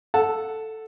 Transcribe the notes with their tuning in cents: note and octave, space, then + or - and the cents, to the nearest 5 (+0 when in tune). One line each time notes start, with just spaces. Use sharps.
A4 +0 F#5 +0 A5 +0